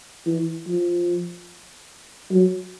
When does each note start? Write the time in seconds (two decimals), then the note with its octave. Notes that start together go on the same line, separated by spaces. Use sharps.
0.27 E3
0.67 F3
2.32 F#3